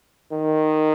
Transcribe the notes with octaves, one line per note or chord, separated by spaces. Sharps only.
D#3